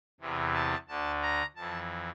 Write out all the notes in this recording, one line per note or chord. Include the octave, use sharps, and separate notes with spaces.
E2 C3 E3
A5
D2 D3 A5
A#5
F2 E3 A5